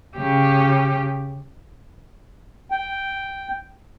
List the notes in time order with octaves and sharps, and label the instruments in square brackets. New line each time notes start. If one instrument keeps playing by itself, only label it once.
[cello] C#3 G4
[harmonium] G5